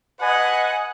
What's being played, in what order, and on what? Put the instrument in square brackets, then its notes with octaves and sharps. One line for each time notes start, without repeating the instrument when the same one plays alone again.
[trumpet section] B4 D#5 G#5 [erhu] F#5